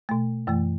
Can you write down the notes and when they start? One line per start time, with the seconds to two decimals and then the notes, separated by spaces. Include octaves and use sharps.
0.09 B2 A3
0.47 F#2 E3 A3